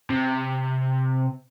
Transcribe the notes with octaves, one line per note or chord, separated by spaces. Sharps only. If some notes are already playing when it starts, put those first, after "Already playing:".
C3